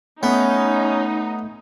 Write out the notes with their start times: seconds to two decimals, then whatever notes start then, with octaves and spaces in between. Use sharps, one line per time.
0.23 A3 B3 C#4 D#4